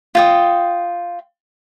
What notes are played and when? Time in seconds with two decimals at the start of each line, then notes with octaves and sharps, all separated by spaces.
0.15 F4 G5 D#6